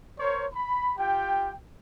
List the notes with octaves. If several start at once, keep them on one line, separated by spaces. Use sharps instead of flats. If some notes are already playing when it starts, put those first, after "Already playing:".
A#4 C5 C#5
B5
F4 G4 G5